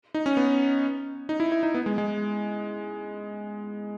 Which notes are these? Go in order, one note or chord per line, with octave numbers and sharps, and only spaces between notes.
D#4
C#4
B3
D#4
E4
E4
D#4
B3
G#3
G#3